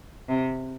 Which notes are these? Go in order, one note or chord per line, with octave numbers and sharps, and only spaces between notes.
C3